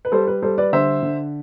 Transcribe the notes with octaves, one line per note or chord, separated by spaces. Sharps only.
B4
G3 A4 C5
B4
G3 A4 C5
B4 D5
D3 C5 E5
D3